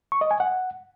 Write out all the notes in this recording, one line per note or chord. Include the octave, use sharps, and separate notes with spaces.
C#6
D#5
G#5
F#5